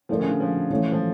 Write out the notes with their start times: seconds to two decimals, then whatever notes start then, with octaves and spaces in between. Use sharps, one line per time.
0.09 F3 A3 E4 A#4 D5
0.20 C#3
0.30 D3
0.40 F3
0.70 E3 A3 C#4 F4 A4
0.92 F3